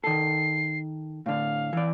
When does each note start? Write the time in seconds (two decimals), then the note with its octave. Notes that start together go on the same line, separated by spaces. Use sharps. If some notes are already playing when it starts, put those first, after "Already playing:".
0.04 D#3 A4 C7
1.26 A2 D3 F5
1.73 E3 D5